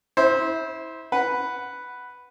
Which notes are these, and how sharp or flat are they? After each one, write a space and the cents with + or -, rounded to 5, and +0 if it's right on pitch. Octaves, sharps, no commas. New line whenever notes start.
E4 -25 C5 +0
B4 +0 F#5 +0